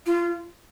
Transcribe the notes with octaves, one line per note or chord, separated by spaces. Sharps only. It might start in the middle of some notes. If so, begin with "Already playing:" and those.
F4